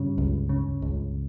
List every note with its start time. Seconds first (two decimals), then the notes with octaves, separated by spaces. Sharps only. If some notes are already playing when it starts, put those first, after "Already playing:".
Already playing: G2 C#3 G3
0.18 C#2
0.49 C#3
0.82 C#2